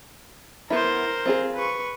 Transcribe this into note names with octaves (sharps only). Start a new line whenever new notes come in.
B3 E4 A#4 C5
C4 F4 G#4
B4 C#6